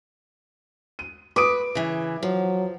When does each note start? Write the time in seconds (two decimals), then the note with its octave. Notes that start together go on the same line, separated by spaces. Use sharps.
0.99 D#7
1.36 B4 D6 D#6 D7
1.75 C#3 E3
2.23 F3 F#3